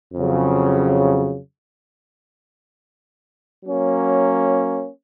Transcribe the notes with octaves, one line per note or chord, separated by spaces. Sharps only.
F2 C#3 F#3
F#3 A#3 C#4